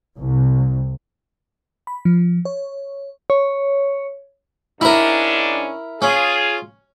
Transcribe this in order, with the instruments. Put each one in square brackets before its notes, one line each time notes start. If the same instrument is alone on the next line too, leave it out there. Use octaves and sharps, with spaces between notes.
[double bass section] C2
[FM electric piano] B5
F3
C#5
[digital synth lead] C#5
[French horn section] G#2 C#4 D4 [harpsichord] E4 A#4
[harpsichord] C#4 [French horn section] F4 G#4